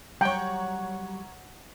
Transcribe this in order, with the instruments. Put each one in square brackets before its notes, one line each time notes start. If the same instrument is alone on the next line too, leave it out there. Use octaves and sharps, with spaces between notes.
[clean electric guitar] F#3 G3 [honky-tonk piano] C#5 A#5 [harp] F#5 [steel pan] G5